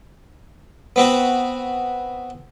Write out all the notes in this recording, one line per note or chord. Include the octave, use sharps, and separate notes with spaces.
B3 C4 F#4